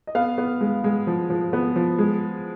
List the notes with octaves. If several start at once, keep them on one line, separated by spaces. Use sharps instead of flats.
D#5
B3 F5
B3
G#3
G#3
F3
F3
B3
F3
G#3